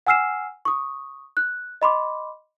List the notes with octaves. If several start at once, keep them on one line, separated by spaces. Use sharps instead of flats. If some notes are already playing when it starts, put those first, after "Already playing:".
F#5 G#5 E6 F6 C7 E7
C#6 D#6
F#6
D#5 B5 C6 D6